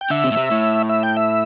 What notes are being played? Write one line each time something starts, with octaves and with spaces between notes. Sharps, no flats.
G5
D3 E5
C3
A2
C3
A2
E5
G5
E5